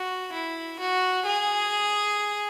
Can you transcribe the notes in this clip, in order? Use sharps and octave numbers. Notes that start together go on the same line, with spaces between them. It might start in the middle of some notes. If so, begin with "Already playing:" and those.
Already playing: F#4
E4
F#4
G#4